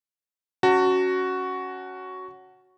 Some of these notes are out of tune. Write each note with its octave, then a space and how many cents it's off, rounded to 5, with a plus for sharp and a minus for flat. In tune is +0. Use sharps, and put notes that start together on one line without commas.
C#4 +0 F#4 +5 A5 +35